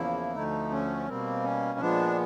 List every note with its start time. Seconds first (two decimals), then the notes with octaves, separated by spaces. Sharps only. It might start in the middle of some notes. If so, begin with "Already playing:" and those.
Already playing: E2 C#3 F3 A#3 E4
0.35 D2 D3 F3 A3 D#4
0.72 C#4
1.07 B2 G3 A#3 C4
1.44 C#4
1.79 A#2 F3 G#3 B3 D4